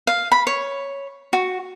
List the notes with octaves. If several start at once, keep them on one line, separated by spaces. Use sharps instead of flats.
F5
B5
C#5
F#4